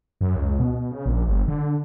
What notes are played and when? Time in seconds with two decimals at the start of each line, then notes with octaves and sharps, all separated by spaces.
0.21 F#2
0.36 C#2
0.59 B2
0.91 C#3
1.06 A#1
1.27 G1
1.48 D3